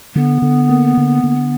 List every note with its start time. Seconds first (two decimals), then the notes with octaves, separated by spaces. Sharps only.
0.15 D3 B3
0.42 D3
0.69 A#3
0.97 D3
1.23 D3